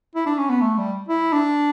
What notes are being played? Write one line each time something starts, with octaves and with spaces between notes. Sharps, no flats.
E4
D4
C#4
B3
A3
G3
E4
D4